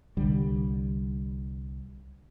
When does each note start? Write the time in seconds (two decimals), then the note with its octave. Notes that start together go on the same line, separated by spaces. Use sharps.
0.17 C2 D3 G3